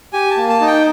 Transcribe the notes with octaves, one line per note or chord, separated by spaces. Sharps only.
G4 G#5
A5
A#3
A5
D#4
G5